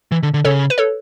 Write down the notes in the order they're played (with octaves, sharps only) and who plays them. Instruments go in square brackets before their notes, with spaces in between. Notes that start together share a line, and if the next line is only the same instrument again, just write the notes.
[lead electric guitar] E3
D3
D3
[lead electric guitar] C#3 [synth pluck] A4 C#5
[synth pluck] B4
A4 C#5